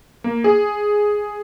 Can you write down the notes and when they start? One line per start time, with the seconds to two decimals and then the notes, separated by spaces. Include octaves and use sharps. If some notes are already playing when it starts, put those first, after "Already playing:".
0.24 A#3
0.44 G#4